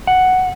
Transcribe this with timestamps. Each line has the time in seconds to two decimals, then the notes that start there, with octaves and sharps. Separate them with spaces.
0.07 F#5